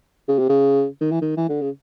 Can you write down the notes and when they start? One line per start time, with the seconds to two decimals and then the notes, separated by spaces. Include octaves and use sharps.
0.29 C#3
0.39 C3
0.50 C#3
1.01 D#3
1.12 E3
1.22 D#3
1.37 E3
1.49 D3
1.61 C#3